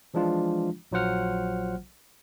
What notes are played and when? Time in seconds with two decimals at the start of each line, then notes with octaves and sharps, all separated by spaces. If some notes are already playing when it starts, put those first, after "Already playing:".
0.14 E3 F3 G#3 D4 F4
0.92 A#1 F#3 F4 C5 F#5 F6